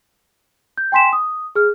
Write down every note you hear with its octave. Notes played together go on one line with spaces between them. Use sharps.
G6
G5 G#5 C6 B6 E7
D#6
G#4 F6